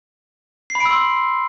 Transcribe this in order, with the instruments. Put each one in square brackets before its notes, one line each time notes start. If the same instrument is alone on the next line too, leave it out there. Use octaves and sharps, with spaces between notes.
[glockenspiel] C7
B5
D7
E6
C6